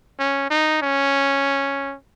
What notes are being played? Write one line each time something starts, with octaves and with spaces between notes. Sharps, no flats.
C#4
D#4
C#4